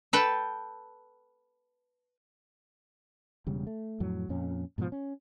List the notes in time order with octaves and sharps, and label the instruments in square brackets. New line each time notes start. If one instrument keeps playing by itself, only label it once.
[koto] A4 B4 G5 A5
[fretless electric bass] E1 C#3 G3
A3
F2 A2 F#3
F2 A#2 C#4
G#2 B2 D#3 F3
C#4